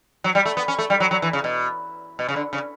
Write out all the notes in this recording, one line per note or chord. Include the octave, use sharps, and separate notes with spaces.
F#3
G3
A3
B3
C#4
A3
G3
F#3
F#3
E3
C#3
B2
B2
C#3
D3
C#3